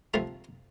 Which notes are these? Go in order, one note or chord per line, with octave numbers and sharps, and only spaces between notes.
C3 F3 A3 A#5